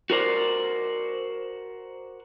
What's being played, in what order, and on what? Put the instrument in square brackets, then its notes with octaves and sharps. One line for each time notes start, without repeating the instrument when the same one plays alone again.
[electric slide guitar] F#4 A#4 C5 D5